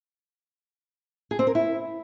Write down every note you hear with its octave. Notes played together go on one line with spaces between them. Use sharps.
G#4
C4
A#4
E4